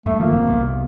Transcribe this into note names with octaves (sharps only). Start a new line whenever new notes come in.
G2 A3
D#3 F3 A#3
G#1 F#2 C3
C2 C3 B3